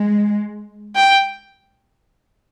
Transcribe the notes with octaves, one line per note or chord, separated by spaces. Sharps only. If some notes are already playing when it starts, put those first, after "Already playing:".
Already playing: G#3
G5